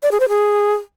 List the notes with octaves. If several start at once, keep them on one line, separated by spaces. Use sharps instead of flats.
D5
G#4
C5
G#4